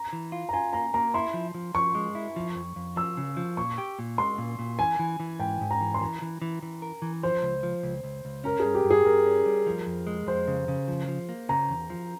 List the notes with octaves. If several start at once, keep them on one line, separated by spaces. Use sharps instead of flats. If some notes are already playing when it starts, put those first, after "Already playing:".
Already playing: A#5
E3
F4
A#5
F4 G#5
A#3 A#5
A#3 A#5
E4 C6
F3
F3
F3 C#6
G#3
E4
F3
F2
F2
F3 E6
C#3
F3
A#2 C#6
G4
A#2
G#3 C6
A#2
A#2
E3 G#5
E3
E3
G#2 G5
G#2
A#5
E3
C6
E3 A#5
E3
E3
E3
A#4
E3
F3 C5
C#2
F3
C#2
C#2
C#2
C#4 A#4
G#4
G2
G4
G2
G#4
G2 A#4
C#4
G3
F3
F2
G#3
F2 C5
C#3
C#3
F3
F3
A#3
C#3 A#5
E2
F3